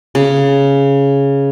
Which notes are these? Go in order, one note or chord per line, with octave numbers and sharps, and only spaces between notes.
C#3